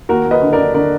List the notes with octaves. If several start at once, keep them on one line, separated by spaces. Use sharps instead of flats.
D#2 F#4 A#4
D#2
B4 D#5
D3
A#4 D5
D3
D3 A#4 D5